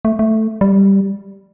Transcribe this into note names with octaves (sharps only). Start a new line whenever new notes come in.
A3
A3
G3